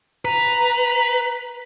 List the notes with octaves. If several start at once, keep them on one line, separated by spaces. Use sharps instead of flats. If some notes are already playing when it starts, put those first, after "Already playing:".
B4 A#5